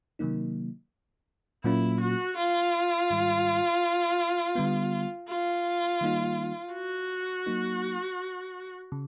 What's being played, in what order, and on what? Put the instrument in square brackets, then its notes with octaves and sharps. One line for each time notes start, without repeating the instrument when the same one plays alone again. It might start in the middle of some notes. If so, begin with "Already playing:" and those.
[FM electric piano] C3 D#3 F#3 A#3 D#4
[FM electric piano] A#2 F#3 A#3 C#4 F4 [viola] E4
[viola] F#4
F4
[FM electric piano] G#2 D#3 G3
D3 G3 B3
[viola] F4
[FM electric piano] D#3 G3 A#3 D#4
[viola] F#4
[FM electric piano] F#3 A#3 D#4
C#3